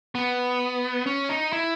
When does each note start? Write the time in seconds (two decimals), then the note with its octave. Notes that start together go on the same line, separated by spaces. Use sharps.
0.15 B3
1.06 C#4
1.29 D#4
1.53 E4